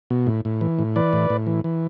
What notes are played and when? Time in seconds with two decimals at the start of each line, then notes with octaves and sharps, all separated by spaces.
0.10 B2
0.27 A2
0.45 A2
0.61 E3
0.79 A2
0.96 E3 B4 D5
1.13 A2
1.30 A2
1.47 E3
1.64 E3